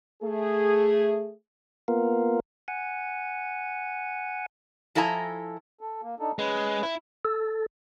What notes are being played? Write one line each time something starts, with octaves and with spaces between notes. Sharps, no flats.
A3 G#4
A#3 B3 F4 A#4
F#5 G#5
F3 E4 A4 D#5 G#5 A#5
A4
A#3
D4 D#4 A4
G#3 C#4 B4
E4
A4